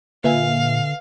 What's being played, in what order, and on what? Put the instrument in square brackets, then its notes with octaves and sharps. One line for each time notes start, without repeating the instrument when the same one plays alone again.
[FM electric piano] A#2 [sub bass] D3 [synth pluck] B4 E5 G#5 [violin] F5